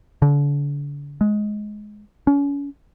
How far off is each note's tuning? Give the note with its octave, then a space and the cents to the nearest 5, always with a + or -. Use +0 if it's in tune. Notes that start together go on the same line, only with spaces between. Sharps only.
D3 -35
G#3 +15
C#4 +35